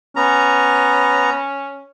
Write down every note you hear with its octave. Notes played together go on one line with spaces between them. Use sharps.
B3 C#4 A#5